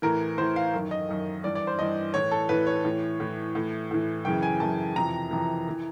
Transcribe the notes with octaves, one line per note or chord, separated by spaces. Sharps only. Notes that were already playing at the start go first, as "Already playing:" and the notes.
A2 E3 A#4
A2 E3 C5
F5
F#2 D#3
D#5
F#2 D#3
G2 E3 D5
D5
C5
G2 E3 D#5
A2 E3 C#5
A4
A2 E3 B4
C#5
A2 E3
A2 E3
A2 E3
A2 E3
F#2 C#3 E3 G5
G#5
F#2 C#3 E3 A5
F2 C3 E3 A#5
F2 C3 E3
E3